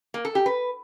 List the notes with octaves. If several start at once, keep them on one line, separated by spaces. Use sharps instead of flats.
A#3
A4
G4
B4